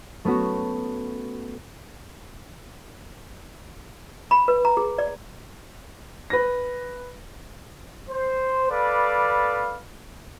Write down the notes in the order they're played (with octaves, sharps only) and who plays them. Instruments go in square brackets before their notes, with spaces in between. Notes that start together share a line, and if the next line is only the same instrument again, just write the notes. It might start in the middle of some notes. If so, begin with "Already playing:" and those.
[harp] A3 B3 C#4 F#4
[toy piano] B5
B4
A#5
G#4
D5
[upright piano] B4 A#6
[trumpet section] C5
A4 B4 D5 F5 B5 D6